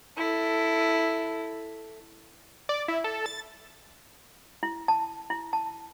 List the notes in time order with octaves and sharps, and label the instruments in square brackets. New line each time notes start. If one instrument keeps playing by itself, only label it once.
[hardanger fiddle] E4 A4
[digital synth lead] D5
E4
A4
A6
[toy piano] E4
A5
E4
A5